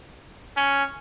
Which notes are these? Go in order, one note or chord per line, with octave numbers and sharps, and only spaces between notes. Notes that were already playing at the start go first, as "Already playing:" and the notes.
C#4